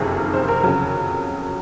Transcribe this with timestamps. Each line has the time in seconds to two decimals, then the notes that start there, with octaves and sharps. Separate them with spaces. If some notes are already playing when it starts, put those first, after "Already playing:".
Already playing: F#1 F2 C3 D#3 G#4
0.18 A#4
0.33 C5
0.49 A#4
0.63 F2 C#3 F#3 A#4